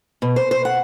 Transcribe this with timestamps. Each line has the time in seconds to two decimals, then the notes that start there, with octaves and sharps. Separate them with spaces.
0.22 B2
0.36 C5
0.51 C5
0.65 F#5